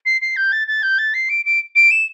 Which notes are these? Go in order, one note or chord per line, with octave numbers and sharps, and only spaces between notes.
C7
C7
G6
A6
A6
G6
A6
C7
D7
D7
D7
E7